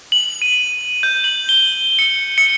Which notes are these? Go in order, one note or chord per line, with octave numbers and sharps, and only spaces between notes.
F#7
D#7
G6
F#7
G7
C#7
C#7